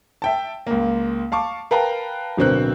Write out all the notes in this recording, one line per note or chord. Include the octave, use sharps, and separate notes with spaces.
E5 G5 A5
C#2 A#3
F5 A5 C#6 D6
A#4 B4 F5 G5 A5 A#5
D1 B2 D3 C4 A#4 F#6